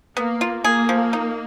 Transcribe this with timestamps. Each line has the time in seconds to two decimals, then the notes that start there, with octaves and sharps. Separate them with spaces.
0.16 A#3 B3
0.41 F4
0.64 A#3 G#4
0.89 F3
1.13 D#4